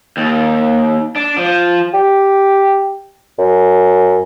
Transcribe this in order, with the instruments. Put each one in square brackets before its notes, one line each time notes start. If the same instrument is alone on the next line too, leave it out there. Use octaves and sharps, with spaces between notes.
[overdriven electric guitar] D#2
D4
F3
[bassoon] G4
F#2